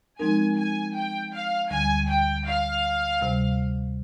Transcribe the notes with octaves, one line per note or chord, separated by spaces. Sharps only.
F3 G#3 C4 D#4 A#4 G#5
G#5
G5
F5
D2 D3 G3 G#5
G5
F5
D2 C3 G3